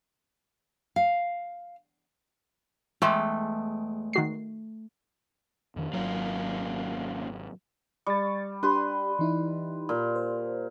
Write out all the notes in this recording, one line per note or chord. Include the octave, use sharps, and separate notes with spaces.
F5
E2 G#3 A3 G5
D#3 F#4 C7
F2 D#3 D4
G#1 F#3 A#3 C#4 F4
G3 C#6 A6
D4 G4 B4 C6
E3 D#4 E4
A#2
C5